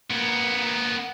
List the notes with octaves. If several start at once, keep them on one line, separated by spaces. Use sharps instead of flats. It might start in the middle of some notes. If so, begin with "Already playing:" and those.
A#3 B3